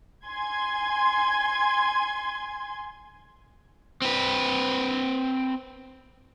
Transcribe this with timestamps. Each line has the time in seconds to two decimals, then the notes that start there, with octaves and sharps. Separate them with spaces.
0.26 G#5 C6 G#6
4.02 C4 B4